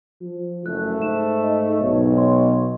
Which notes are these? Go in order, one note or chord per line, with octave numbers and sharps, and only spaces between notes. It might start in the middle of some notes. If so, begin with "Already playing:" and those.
F3
F#1 A3 F#6
G#2 E5 E7
D#5
B1 C#5
D#5 C6